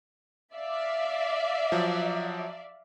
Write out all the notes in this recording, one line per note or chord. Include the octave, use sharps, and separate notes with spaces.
D5 E5 F5
F3 F#3